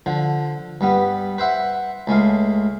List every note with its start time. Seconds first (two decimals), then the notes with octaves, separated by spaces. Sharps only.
0.06 D3 F3
0.81 G2 G3 B3
1.38 B4 C5 E5 F#5
2.07 C#2 G#3 A3 F5